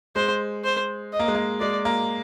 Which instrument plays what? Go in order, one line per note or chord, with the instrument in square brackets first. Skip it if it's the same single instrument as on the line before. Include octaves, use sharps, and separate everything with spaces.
[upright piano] G#3 [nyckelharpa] C5
[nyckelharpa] C5
D#5
[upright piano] A#3
G#3
A#3
[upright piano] G#3 [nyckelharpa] D5
[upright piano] A#3